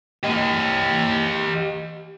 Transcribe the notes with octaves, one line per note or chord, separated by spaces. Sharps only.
G4 D#5